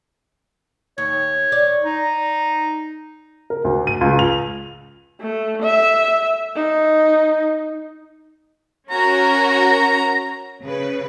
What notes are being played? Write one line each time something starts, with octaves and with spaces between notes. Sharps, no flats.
D#2 C#5
D5
D#4
A#4
D2
D#7
C#2
F7
A3
E5
D#4
C#4 F#4 A#4 A#5
C#3 B4